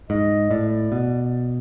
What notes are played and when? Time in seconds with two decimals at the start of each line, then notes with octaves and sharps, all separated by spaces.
0.10 G#2 D#5
0.51 A2 D5
0.92 B2